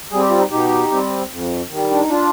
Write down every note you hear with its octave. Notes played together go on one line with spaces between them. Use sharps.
G3 C4 G#4
G4
F4
D#4 G4
B2 D#4 G4
G3 C4
F2
D#3 G3
D4
D#4
D4 F4